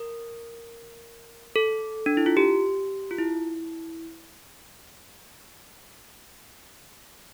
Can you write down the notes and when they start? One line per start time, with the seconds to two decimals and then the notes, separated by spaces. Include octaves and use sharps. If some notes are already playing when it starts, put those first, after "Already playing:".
Already playing: A#4
1.56 A4
2.06 D4
2.17 E4
2.26 F4
2.37 G4
3.11 F4
3.18 E4